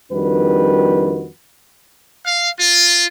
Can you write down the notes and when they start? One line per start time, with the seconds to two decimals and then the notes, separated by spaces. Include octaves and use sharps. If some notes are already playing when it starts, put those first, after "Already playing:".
0.12 F2 D#3 G3 D4 F#4 B4
2.25 F5
2.59 F4